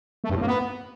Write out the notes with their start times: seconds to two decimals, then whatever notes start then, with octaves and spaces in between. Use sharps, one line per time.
0.24 A3
0.30 G2
0.35 A2
0.41 A#3
0.47 B3